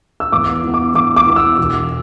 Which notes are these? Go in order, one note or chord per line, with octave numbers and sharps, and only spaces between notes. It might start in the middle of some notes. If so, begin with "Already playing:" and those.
E6
E2 D6
E3 B3
D6
E2 D6
D6
E3 B3
E6
E1